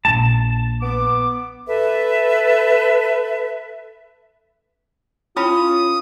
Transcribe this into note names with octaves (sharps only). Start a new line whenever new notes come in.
A#1 A5
B3 D6
A4 B4 E5
C#4 E4 F4 G5 B5 D#6